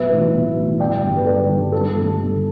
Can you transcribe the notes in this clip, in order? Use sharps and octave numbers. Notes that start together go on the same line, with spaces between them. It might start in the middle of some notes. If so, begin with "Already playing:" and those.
Already playing: B1 B4 E5
A2 E3
B1
A2 E3
G1 D5 G5
G2 D3
B4
G1 A4 D5
G2 D3
G1 A4
G2 D3 A3
G1